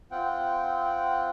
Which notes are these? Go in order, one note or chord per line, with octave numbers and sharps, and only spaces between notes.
C4 F4 F#5 G5